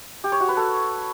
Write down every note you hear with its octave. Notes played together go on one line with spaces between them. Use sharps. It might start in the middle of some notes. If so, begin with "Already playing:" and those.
G4
C#5
F#4
B4
A4